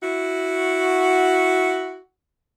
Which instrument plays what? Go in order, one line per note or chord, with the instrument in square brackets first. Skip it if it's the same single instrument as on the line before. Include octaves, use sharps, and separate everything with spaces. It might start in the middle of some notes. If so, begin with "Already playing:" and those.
[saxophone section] E4 F#4